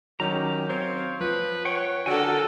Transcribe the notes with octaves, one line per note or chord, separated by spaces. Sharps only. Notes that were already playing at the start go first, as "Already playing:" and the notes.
D#3 F#3 C#4 G4 A#5
C4 C5 C#5 F5
F3 B4
B4 C#5 F#5 G5
D3 F#4 A4 A#4 G5 G#5